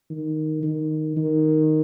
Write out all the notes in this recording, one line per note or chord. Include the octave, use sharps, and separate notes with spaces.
D#3
D#3
D#3